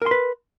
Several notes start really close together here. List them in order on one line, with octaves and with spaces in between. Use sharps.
A#4 C6 B4